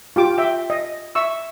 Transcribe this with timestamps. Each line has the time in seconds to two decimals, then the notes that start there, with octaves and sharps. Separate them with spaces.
0.16 F4 G4 D6
0.38 E5 G5
0.70 D#5
1.15 E5 C#6 E6